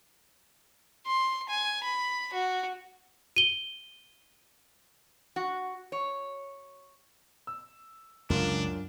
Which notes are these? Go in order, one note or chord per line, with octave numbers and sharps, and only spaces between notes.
C6
G#5
B5
F#4
D#7 G7
F#4
C#5
E6
C#2 F#2 D3 D4 F4